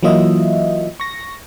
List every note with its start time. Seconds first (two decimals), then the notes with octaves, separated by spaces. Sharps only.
0.03 E3 F#3 A#3 F4 D#5 E5
1.00 C#6 A#6